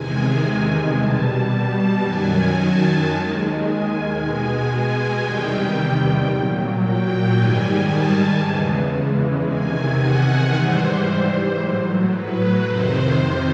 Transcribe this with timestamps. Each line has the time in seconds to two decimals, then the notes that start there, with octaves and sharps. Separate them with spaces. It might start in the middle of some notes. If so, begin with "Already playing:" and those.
Already playing: E2 C3 D#3 G#3 G#5
0.42 G#5
0.95 B2 G3 A5
2.02 F#2 D#3 F#3 G#5
2.55 A5
3.09 D#2 D#3 G#3
3.62 G#5
4.14 B2 G#3 G#5
5.21 E2 C3 D#3 G3 G5
6.27 A#2 F#3
6.81 G5
7.34 G#2 D#3 G3 G#5
7.87 A5
8.41 E2 C#3 E3 G#3
9.46 E2 C3 D#3 G#5
10.00 F#5
10.53 G#2 E3 G3 C5
11.60 A2 F#3
12.13 B4
12.66 F2 C3 D#3 C5